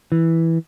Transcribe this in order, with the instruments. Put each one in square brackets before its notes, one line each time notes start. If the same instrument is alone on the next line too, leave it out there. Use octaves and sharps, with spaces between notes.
[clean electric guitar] E3